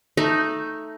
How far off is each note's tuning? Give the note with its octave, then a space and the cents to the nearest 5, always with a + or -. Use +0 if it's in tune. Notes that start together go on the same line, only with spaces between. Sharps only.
A3 +0 D#4 +0